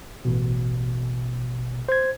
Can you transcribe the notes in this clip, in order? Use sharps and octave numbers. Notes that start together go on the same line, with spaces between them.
A1 B2
C5 G#6